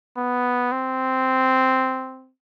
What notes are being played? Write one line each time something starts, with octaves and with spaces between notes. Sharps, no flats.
B3
C4